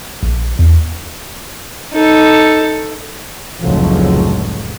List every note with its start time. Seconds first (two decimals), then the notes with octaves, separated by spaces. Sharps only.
0.23 A#1
0.59 E2
1.94 D#4 A4
3.60 F1 C#2 A2 D3 F3 F#3